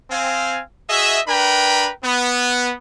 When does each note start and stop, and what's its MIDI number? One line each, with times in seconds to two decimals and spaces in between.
0.11 0.61 60
0.11 0.61 77
0.11 0.61 80
0.89 1.20 66
0.89 1.20 68
0.89 1.20 75
0.89 1.20 76
1.27 1.91 62
1.27 1.91 70
1.27 1.91 71
1.27 1.91 79
1.27 1.91 82
1.27 1.91 83
2.04 2.73 59